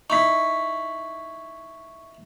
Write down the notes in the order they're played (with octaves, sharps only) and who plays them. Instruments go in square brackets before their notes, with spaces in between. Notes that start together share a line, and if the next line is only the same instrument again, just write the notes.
[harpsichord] D#4 E4 [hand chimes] C#6 B6